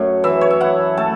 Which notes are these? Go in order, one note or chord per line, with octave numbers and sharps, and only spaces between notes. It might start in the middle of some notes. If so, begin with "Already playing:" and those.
Already playing: F#2 A3 C#5
E3 E5
C#5
E5
E4 F#5
A3 A5